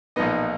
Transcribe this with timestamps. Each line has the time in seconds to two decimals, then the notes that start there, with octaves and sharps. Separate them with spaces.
0.16 B1 A#2 F3 B3 D#4 D#5